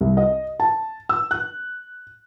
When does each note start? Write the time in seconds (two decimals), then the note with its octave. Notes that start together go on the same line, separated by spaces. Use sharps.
0.01 C2
0.17 D#5
0.60 A5
1.09 E6
1.31 F#6